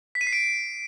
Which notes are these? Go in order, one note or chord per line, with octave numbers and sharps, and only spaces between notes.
B6
D#7
C7
D7